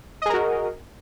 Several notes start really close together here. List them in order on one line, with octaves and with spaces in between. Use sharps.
D#5 G#4 A#4 F#4